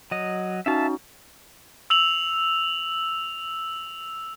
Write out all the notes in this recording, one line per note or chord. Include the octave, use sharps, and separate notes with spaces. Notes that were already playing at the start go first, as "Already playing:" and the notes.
F#3 D#5
C#4 D#4 F#4 E5 F5 A5
E6 F7 F#7